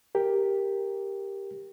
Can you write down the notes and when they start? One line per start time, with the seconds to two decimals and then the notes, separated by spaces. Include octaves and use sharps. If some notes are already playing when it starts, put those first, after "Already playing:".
0.15 G4 A#4